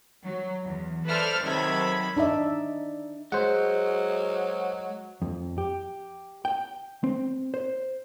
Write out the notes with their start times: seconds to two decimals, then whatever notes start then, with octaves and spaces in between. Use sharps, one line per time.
0.24 F#3
0.64 E2
1.07 A4 B4 C5 D5 E5 F6
1.44 C3 D#3 F#3 A4 B5 G#6
2.17 D4 D#4 D5 E5
3.32 F#3 G#3 C5 F#5
5.22 F2
5.58 G4
6.45 G5
7.04 C4
7.54 C5